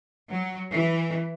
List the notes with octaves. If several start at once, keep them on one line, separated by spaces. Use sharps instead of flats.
F#3
E3